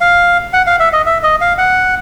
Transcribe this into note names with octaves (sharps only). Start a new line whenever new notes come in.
F5
F#5
F5
E5
D#5
E5
D#5
F5
F#5